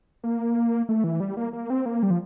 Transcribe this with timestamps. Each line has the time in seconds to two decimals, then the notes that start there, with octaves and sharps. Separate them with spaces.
0.24 A#3
0.89 A3
1.04 E3
1.20 G3
1.37 A#3
1.53 A#3
1.70 C4
1.86 A#3
2.03 G3
2.10 F3